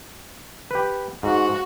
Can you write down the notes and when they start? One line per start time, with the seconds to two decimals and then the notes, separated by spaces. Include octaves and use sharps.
0.71 G4 B4
1.23 G#2 F#4